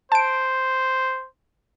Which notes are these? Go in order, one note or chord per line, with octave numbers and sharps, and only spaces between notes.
C5 A5 D7